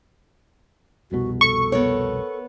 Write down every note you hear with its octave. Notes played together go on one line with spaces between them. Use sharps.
F1 C2 B2 F#4
A4 C#6
B3 A#4 C#5